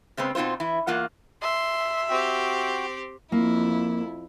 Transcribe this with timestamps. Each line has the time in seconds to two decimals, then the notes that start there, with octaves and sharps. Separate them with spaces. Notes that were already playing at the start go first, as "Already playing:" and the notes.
0.17 C#3 G#3 B3 C4
0.35 B2 C4 D#4 F4 C5
0.60 E3 E4
0.87 E2 A#3 F4 F#5
1.42 E5 C6
2.10 C4 F#4 G4 G5
3.32 F2 A#3 E4